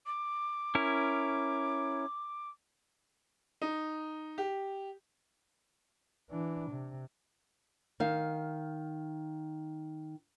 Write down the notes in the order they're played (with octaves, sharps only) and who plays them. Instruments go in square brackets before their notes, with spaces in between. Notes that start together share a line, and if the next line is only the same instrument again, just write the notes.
[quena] D6
[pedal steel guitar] C#4 E4 A#4
[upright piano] D#4
G4
[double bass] E3 D4
C3
[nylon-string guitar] D#3 F5